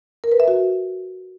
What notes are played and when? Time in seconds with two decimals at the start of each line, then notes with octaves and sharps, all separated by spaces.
0.24 A#4
0.32 B4
0.40 E5
0.48 F#4